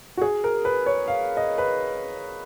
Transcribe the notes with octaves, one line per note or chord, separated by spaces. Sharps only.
F#4
G#4
A#4
B4
C#5
F5
D#5
B4